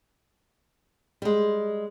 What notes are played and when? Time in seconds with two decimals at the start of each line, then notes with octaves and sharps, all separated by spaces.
1.22 G3 G#3